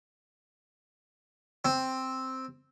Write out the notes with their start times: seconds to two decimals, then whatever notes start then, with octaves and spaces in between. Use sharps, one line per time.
1.65 C4